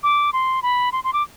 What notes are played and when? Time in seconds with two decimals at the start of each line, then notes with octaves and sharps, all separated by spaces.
0.03 D6
0.33 C6
0.63 B5
0.92 C6
1.04 C6
1.13 D6